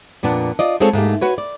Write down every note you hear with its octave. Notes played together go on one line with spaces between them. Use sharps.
F2 A#2 B3 D4
F4 D5 D#5
G#3 C4 F4 G#4 A4 C#5
G#2 A3 A#3 G4
F#4 B4 C#5
D5